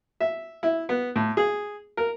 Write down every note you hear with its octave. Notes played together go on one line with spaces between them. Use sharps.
E5
E4
B3
A2
G#4
A#4